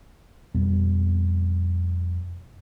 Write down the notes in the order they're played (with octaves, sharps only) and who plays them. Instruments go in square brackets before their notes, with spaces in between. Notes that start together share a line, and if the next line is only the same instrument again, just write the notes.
[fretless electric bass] F2 B2 G3 B3